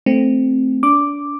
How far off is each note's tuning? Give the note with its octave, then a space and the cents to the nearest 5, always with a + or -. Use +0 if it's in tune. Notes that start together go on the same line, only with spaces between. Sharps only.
A3 +0 C4 +0
D4 -30 D6 +0